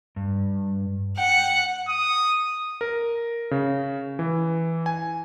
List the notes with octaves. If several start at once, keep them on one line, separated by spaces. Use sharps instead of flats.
G2
F#5 G5
D#6
A#4
C#3
E3
G#5